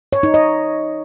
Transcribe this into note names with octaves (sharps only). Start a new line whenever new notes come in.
C#5
D#4
D#5